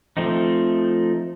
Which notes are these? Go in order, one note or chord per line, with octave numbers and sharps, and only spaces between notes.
F3 A3 C4 D#4